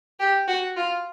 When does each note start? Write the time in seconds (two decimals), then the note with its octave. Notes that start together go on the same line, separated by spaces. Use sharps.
0.20 G4
0.48 F#4
0.76 F4